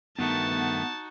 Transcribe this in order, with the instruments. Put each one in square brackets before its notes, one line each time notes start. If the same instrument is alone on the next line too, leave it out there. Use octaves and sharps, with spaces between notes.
[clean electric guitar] G2 D#3 A3 [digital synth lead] B3 [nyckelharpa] D#4 F#4 [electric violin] A5